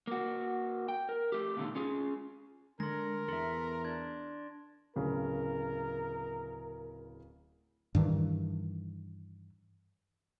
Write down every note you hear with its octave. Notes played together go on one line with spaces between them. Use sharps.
A#3 F#4
G5
A#4
A3 G4
A#2 D3 D#3 A3
C#4 F4 G#4
D3 G#3 A4 A#4 C6 A#6
E2 A4 E5 C6
D4 G#6
D1 C#3 A#4
G2 D#3 E3